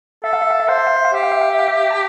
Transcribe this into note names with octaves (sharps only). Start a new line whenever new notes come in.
A4 E5
F5
E5
F5
E5
C5 F5
E5
F5
E5
F5
G4 E5
F5
E5
F5
E5
F5
E5
A5